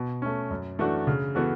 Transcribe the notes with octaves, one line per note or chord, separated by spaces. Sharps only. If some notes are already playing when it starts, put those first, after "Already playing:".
Already playing: B2
A3 C#4
F#2
E3 A3 D4 F#4
C#3
E3 B3 F#4 A4